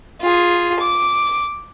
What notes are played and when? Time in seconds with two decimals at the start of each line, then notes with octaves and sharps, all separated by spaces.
0.21 F4 G#4
0.80 D6